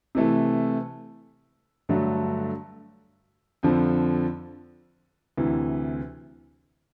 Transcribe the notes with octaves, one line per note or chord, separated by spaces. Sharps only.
C3 E3 A3
G2 D3 F#3 A3
F2 D3 F3
D2 C3 E3